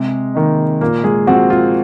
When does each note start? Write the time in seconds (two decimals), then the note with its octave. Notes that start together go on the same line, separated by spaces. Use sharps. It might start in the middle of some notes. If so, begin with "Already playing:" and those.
Already playing: C3 G#3
0.35 D#3 A#3 D#4
0.81 A#2 A#3 A#4
1.04 G#3 G#4
1.27 F3 C4 F#4
1.50 F4